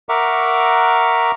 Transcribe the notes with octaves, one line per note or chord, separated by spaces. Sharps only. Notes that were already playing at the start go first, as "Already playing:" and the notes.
A#4 E5 F#5 A#5 C#6 D6